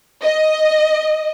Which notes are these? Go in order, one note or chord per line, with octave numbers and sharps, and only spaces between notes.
D#5